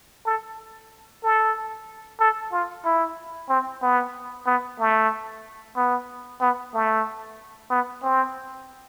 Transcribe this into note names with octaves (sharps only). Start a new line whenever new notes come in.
A4
A4
A4
F4
E4
C4
B3
B3
A3
B3
B3
A3
B3
C4